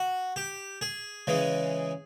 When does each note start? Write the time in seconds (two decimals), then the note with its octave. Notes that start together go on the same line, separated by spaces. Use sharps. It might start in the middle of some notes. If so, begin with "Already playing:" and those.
Already playing: F#4
0.36 G4
0.81 G#4
1.27 C#3 E3 G#3